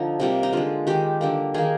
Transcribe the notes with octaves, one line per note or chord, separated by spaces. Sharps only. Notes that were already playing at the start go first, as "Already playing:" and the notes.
Already playing: D3 F3 D#4
C3 G3 A#3
D#4
D3 G#3 F4
D#3 G#3 G4
D3 G3 A#3
D#3 A#3 G#4